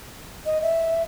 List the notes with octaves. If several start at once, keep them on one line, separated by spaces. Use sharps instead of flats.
D#5
E5